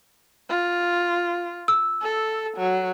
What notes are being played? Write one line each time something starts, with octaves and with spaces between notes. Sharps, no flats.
F4
E6
A4
F#3